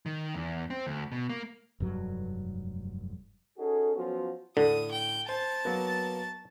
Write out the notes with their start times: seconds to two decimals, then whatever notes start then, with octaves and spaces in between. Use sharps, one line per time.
0.06 D#3
0.35 E2
0.70 C4
0.87 D2
1.12 B2
1.29 A#3
1.80 F1 G2 F#3
3.58 C#4 D#4 F#4 G#4 A4
3.95 F3 F#3 B3 C#4 F4 F#4
4.57 A2 D3 D#6
4.92 G5
5.29 C5 A5 A6
5.65 F#3 A#3 B3